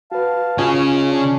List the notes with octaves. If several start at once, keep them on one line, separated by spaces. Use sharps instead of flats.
F#4 B4 F5 A5
C#3 C#4 F4 G#4 D#5
D4